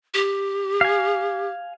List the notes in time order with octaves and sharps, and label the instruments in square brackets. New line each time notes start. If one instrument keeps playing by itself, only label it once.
[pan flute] G4
[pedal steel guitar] F5 G#5